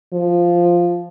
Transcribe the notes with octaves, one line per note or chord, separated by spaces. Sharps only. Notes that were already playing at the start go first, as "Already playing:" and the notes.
F3